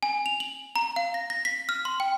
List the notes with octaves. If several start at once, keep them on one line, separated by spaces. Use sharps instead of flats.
G#5
F7
F#7
A#5
F5
A#6
A#6
B6
F6
C6
G5